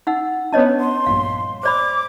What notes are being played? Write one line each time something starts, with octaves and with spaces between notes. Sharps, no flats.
D#4 F#5 E6
B3 C#4 D4 C#5 D#5 A5
C6
A#1 G2 F5
C5 D5 B5 D6